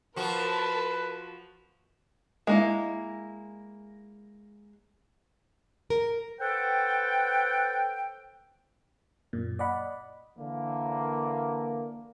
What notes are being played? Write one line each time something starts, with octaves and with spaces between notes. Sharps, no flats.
F3 F#4 A#4 B4 A5 C6
G#3 A#3 E4
A#4
A4 B4 C5 F#5 G5
F#2 A#2
D5 D#5 F#5 B5
D3 E3 A#3